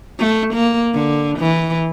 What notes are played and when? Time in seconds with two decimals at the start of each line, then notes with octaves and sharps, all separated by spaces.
0.19 A3
0.54 A#3
0.93 D3
1.39 E3